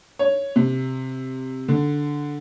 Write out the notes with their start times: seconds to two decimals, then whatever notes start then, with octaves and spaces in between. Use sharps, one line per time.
0.19 C#5
0.56 C3
1.68 D3